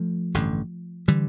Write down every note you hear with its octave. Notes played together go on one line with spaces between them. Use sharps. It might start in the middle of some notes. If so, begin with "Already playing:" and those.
Already playing: F3 A3
A1 G2 D3
D3 E3 G3